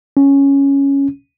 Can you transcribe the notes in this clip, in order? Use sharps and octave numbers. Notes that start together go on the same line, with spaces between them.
C#4